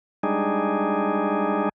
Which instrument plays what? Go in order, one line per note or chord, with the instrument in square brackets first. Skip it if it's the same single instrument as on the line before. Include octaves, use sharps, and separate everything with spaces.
[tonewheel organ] G3 G#3 D4 D#4 G#4